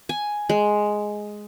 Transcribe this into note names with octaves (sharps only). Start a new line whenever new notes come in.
G#5
G#3